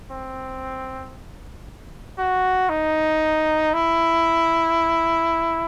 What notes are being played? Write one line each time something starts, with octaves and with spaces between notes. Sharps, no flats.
C4
F#4
D#4
E4